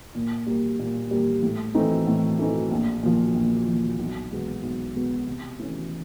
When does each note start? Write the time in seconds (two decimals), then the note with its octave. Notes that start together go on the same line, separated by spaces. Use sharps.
0.15 A#2
0.47 G3 A#3
0.79 A#2
1.11 G3 A#3
1.43 A2
1.74 E3 A3 C4 D#4
2.07 A2
2.39 E3 A3 C4 D#4
2.71 A#1
3.03 A#2 F3
3.35 A#1
3.67 A#2 F3
3.99 B1
4.31 B2 G#3 B3
4.63 B1
4.95 B2 G#3 B3
5.27 C3
5.59 E3 A3 C#4